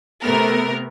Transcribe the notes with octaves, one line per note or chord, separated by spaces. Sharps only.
C3 A3 B3 A#4